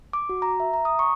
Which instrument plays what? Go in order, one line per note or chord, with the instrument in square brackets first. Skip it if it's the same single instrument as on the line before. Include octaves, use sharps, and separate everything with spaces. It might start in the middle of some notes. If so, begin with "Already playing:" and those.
[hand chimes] D6
F#4
A#5
E5
A#5
D#6
C#6